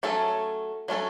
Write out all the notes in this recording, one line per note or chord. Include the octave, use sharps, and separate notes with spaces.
F#3 A3 C#4 A4
F#3 A3 C#4 A4